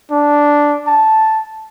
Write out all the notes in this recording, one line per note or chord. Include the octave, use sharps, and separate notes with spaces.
D4
A5